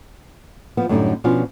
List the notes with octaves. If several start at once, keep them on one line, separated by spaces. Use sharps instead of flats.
F3 B3
F#2 A2 D3 G3 D#4
B2 F3 C#4 D4 F4